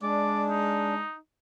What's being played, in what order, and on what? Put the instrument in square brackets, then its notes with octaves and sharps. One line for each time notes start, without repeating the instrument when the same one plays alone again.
[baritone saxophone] G#3 [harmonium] D4 [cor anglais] D5
[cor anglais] D#4